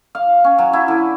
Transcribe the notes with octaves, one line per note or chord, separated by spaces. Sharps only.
F5
C#4
F#3
E4
D3